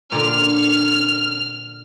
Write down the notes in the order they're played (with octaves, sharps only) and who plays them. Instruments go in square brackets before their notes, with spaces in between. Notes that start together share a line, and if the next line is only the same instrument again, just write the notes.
[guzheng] A#2 D3 D4 [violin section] F6